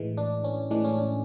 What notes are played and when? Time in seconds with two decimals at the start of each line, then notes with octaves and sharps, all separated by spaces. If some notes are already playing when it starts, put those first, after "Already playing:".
Already playing: A2 E3 G#3
0.17 D4
0.44 C#4
0.70 A2 E3 G#3 D4
0.85 C#4
0.98 D4